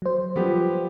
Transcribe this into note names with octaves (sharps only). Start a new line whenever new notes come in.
F#3 C5
F3 G3 B3 G4